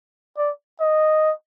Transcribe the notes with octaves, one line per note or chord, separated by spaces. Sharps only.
D5
D#5